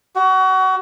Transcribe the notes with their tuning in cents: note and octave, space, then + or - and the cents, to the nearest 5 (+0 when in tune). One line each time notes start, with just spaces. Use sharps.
F#4 +25